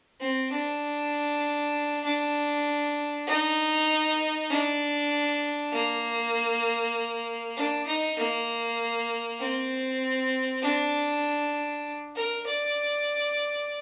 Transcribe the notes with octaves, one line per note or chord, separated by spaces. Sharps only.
C4
D4
D4
D#4
D4
A#3
D4
D#4
A#3
C4
D4
A#4
D5